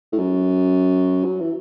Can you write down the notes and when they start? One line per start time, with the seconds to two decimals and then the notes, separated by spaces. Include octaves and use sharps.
0.12 A2
0.19 F#2
1.25 F#3
1.40 E3